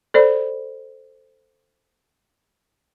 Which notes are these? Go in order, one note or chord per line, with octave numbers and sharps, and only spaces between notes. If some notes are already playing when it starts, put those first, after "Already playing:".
A4 C5 D5 B5